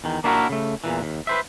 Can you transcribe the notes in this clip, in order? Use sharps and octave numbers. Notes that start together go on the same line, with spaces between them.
E2 D#3
A#3 D4 E4 F#4 G#4 A#4
C#3 A3
E2 A#2 E3
D#2
B4 C5 E5